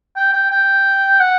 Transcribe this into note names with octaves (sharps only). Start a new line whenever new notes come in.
G5
G5
G5
F#5